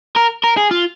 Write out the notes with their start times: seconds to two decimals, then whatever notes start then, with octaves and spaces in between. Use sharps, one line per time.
0.16 A#4
0.44 A#4
0.57 G#4
0.71 F4